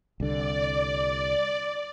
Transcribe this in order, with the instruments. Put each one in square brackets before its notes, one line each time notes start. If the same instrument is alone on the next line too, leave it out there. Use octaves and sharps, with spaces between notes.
[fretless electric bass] C2 D3 [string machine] D5